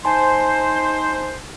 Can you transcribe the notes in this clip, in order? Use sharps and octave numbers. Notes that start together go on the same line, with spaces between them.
D#4 C5 G#5 A5 C6